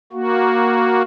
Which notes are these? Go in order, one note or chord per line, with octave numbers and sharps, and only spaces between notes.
A#3 F#4